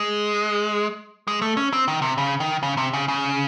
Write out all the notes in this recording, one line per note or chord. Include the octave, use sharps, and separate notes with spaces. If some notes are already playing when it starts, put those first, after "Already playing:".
Already playing: G#3
G#3
A3
C#4
C4
D#3
C3
C#3
D#3
C#3
C3
C#3
C#3